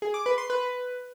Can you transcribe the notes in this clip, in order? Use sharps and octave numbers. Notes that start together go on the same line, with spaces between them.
G#4
D6
B4
C6
B4